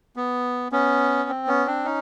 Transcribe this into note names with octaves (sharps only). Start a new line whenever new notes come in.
B3
B3 C#4
C4
B3 C#4
C4 D4
C#4 D#4